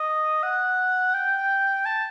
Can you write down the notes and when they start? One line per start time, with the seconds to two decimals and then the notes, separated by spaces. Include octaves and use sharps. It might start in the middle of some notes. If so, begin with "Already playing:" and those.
Already playing: D#5
0.43 F#5
1.14 G5
1.86 A5